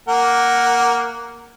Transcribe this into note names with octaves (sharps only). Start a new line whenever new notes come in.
A#3 A#4 F#5